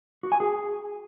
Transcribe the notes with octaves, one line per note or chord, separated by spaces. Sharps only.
F#4
G#5
G#4